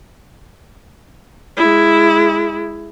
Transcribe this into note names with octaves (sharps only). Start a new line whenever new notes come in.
G#3 E4